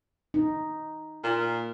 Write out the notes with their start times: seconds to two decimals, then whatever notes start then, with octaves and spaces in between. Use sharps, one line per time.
0.34 D#4
1.24 A#2